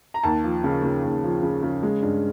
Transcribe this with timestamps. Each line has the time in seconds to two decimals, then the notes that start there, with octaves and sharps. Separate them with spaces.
0.14 A#5
0.23 D#2 A5
0.44 F3
0.64 C#3
0.83 C#3
1.03 D#2
1.23 F3
1.43 C#3
1.63 C#3
1.83 G#3
2.02 G2